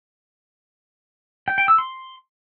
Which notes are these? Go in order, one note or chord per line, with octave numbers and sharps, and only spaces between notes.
G5
G5
E6
C6